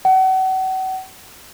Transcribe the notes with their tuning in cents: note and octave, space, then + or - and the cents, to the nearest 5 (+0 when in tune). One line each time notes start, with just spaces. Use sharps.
F#5 +35